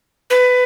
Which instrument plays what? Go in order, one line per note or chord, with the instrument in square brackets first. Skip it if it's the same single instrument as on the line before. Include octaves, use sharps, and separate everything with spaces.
[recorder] B4